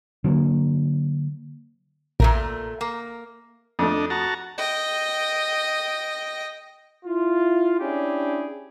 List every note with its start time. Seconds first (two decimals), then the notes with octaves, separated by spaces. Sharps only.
0.24 D3 F#3 G#3 A#3
2.20 A#1 A#2 A3 A#4
2.81 A#3
3.79 F2 A3 D4 D#5
4.10 F#4 A5 A#5
4.58 D#5 G5
7.05 E4 F4
7.80 C#4 D4 E4 G4 G#4